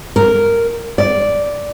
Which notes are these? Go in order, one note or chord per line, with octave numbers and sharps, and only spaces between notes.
A#4
D5